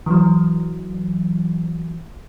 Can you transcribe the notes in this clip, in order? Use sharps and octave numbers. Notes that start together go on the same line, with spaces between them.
E3 F#3